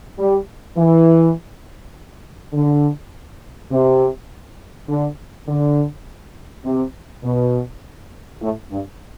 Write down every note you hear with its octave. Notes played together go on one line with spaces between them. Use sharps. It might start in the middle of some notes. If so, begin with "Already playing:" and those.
G3
E3
D3
C3
D3
D3
C3
B2
A2
G2